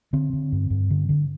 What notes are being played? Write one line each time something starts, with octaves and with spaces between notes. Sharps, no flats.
D3 C4
D3
G2
G2
D3
D3